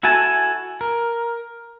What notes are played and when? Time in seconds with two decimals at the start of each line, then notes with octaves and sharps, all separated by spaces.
0.03 E4 F#4 A4 G#5 A5
0.81 A#4